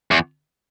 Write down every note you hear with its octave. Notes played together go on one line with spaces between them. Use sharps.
E2